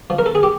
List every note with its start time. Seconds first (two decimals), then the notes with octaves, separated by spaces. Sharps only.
0.10 F3
0.19 A#4
0.26 A4
0.35 G#4
0.43 G4